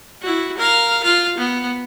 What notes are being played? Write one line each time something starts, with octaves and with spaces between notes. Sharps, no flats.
E4 F#4
A#4 F5
F4 F5
B3